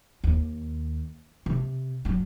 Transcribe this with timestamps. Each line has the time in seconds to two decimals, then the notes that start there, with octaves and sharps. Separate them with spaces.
0.24 D#2
1.46 C3
2.05 F#2 F#3